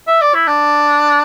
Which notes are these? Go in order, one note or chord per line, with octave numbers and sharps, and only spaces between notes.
E5
D5
E4
D4